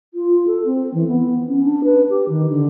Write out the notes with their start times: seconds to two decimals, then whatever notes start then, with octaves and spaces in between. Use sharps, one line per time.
0.14 F4
0.47 A4
0.66 C4
0.94 E3
1.07 B3
1.48 C#4
1.64 D4
1.84 B4
2.10 G4
2.29 D#3
2.50 D3